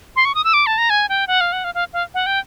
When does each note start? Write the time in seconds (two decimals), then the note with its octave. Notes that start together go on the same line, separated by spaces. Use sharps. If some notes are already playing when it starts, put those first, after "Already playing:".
0.16 C6
0.25 C#6
0.35 D#6
0.44 E6
0.54 D6
0.67 A5
0.78 A#5
0.90 G#5
1.09 G5
1.27 F#5
1.41 F5
1.53 F#5
1.64 F5
1.75 F5
1.93 F5
2.14 F#5
2.26 G5